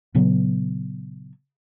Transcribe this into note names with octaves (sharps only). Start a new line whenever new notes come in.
A#2 C#3 F#3 B3